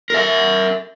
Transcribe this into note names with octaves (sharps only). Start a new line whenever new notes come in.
A#4 E5